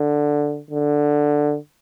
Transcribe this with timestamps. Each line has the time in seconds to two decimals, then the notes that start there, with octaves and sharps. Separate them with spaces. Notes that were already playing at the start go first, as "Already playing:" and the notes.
Already playing: D3
0.70 D3